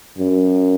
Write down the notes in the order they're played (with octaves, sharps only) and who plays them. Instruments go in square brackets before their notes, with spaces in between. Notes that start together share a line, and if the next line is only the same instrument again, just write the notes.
[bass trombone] F#2